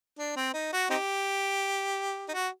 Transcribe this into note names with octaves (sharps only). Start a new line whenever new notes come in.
D4
C4
D#4
F#4
C4 D#4 G4
D#4
F#4